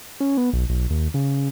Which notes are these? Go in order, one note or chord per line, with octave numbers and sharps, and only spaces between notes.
C#4
B3
B1
B1
D#2
C#3